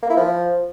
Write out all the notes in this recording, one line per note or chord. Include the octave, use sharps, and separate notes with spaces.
A#3
E4
F3